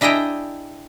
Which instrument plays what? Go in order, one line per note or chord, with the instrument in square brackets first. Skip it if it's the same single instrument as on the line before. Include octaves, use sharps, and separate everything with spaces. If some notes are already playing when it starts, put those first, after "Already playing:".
[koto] D4 E4 G#4 D#5 G5 A#5